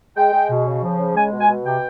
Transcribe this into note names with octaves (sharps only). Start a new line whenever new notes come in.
G#3 G5
G#3
B2
C#3
F3
C#3
G#3 G#5
B2
G#5
B2
C3 G5